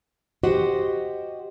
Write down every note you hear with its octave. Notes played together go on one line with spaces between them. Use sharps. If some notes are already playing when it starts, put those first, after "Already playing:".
F#4 G4 C5 D#5 F#5